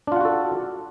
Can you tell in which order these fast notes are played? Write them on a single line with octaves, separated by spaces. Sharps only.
D4 F4 F#5 F#4 A4